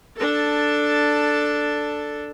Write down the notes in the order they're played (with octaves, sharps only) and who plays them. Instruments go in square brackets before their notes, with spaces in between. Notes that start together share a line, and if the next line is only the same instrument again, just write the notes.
[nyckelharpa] D4 A4